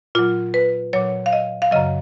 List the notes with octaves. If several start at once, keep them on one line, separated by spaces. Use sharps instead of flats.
A#2 F#3 F4
B4
A#2 F#3 C#5
F5
D#5
F5
F#2 C#3 F#3 D#5